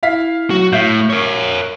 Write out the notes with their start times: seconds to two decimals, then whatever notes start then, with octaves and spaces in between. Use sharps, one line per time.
0.03 E4 F5 B6
0.50 F#3 F#4
0.73 A2 E5 F5 G6
1.10 A#4 C#5